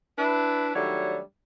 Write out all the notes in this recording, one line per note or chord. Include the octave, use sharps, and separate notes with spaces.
D4 E4 B4
D#3 F#3 G3 A3 D4 C#5